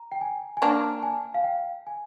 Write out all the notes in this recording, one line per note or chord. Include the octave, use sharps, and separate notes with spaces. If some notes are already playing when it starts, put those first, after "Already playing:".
Already playing: A#5
G5
G#5
G#5
A#3 D4 A#5
G#5
F5
G5
G#5